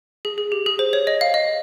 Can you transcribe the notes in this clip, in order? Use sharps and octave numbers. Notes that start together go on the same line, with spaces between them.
G#4
G#4
G4
G#4
C5
C#5
D#5
F5
D#5